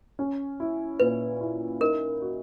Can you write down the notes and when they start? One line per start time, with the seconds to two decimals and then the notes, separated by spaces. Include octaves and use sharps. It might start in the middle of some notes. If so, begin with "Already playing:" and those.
0.19 C#4
0.60 E4
1.00 A#2 B4
1.41 E4
1.81 D#4 A#4
2.22 F#4